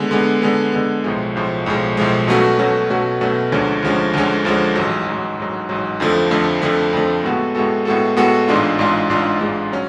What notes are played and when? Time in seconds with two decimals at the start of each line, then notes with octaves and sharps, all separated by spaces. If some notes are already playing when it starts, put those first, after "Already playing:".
Already playing: D3 G#3 B3
0.11 D3 G#3 B3
0.42 D3 G#3 B3
0.73 D3 G#3 B3
1.04 B1 A2 F3 G#3
1.35 B1 A2 F3 G#3
1.66 B1 A2 F3 G#3
1.97 B1 A2 F3 G#3
2.28 B2 F#3 A3 C#4 F#4
2.59 B2 F#3 A3 C#4 F#4
2.90 B2 F#3 A3 C#4 F#4
3.21 B2 F#3 A3 C#4 F#4
3.52 D2 D3 F3 G#3 C#4
3.83 D2 D3 F3 G#3 C#4
4.14 D2 D3 F3 G#3 C#4
4.45 D2 D3 F3 G#3 C#4
4.75 A1 G#2 F#3
5.07 A1 G#2 F#3
5.37 A1 G#2 F#3
5.69 A1 G#2 F#3
6.00 F2 D3 F3 A3
6.31 F2 D3 F3 A3
6.62 F2 D3 F3 A3
6.93 F2 D3 F3 A3
7.24 A2 G#3 B3 F#4 A4
7.55 A2 G#3 B3 F#4 A4
7.85 A2 G#3 B3 F#4 A4
8.16 A2 G#3 B3 F#4 A4
8.48 A1 G#2 G#3 D4 F4
8.79 A1 G#2 G#3 D4 F4
9.10 A1 G#2 G#3 D4 F4
9.41 A1 G#2 G#3 D4 F4
9.72 F#3 C#4